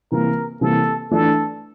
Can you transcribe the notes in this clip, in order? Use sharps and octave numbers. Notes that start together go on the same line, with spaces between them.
C3 E3 G3 A#3 A#4
C3 E3 G3 A#3 A4
E3 A3 D4 A4